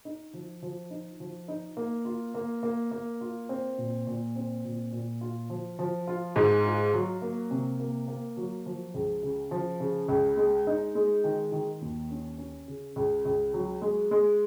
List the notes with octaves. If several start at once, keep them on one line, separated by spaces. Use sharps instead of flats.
D#4
F3
F3
D#4
F3
D#4
A#3
F4
A#3
A#3
A#3
F4
C4
A#2
A#2
C4
A#2
A#2
F4
F3
F3
F4
G#2
F4
F#3
A#3
C3
A#3
A#3
F#3
F3
C#2
C#3
F3
C#3
C#2
G#3
D#4
G#3
D#3
D#3
D#2
C#4
C#4
C#3
C#2
C#2
F#3
G#3
G#3